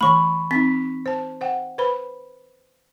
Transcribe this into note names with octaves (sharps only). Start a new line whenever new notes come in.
E3 A3 B5 C#6
C4 D#4 B6
C5 A5
C5 F#5 G5
B4 C5 B5